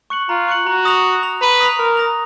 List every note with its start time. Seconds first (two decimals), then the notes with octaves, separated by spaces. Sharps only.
0.10 C#6 F#6 C#7 F#7
0.29 F4 A#5
0.48 C#6 F#6 C#7 F#7
0.67 F#4 A#5
0.85 D#6 A#6 F7
1.04 A#5
1.23 D#6 A#6 F7
1.41 B4 A#5
1.60 D#6 A#6 F7
1.79 A#4 A#5
1.97 D#6 A#6 F7